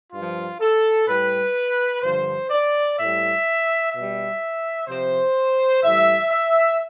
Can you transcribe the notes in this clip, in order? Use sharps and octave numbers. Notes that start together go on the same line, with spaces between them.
G2 F3 F4
A4
A2 G3 B4
G2 D3 F3 C5
D5
A2 G3 E5
B2 G3 E5
C3 F3 C5
A2 E3 G3 E5
E5